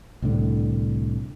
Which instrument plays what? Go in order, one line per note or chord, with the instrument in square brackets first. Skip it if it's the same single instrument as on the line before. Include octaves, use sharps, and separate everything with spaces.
[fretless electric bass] C2 A2 D3